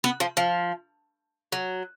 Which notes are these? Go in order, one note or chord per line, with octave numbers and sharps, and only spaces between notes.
B3
F3
F3
F#3